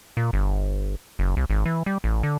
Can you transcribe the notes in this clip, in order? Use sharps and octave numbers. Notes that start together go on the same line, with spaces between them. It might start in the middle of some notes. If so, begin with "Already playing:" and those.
A#2
G1
F#1
C2
G#1
E3
G3
A1
D3